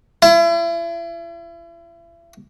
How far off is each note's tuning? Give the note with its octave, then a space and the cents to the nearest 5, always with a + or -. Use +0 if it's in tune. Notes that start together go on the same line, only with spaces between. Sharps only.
E4 +40